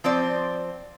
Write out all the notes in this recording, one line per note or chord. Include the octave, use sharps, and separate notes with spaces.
F3 C4 C5 D5